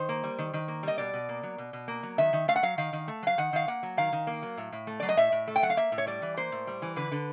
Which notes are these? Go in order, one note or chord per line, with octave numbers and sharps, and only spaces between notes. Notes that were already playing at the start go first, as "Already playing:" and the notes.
Already playing: D#3 C5
A#3
G3
D#3
D#3
A#3
G3 D#5
B2 D5
B2
A#3
F#3
B2
B2
A#3
F#3
D#3 E5
D#3
A3 F5
F#5
F#3 F5
D#3 F5
D#3
A3
F#3 F5
D#3 F#5
D#3 F5
A#3 F#5
F#3
D#3 F5
D#3
A#3
F#3
A2
A2
A3
F#3 D5
D#5
A2 E5
A2
A3
G5
F#3 F#5
F5
A#3 E5
A2
C#5
G3 D5
E3
A#3 C5
A2
G3
E3
D3 B4
D3